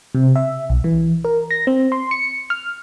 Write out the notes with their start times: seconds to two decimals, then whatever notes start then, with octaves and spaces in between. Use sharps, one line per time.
0.15 C3
0.36 E5
0.70 B1
0.84 E3
1.25 A#4
1.51 A#6
1.67 C4
1.92 C6
2.11 C#7
2.50 F6